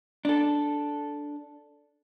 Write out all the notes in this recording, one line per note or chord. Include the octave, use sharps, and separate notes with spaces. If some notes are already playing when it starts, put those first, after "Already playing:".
D4 A4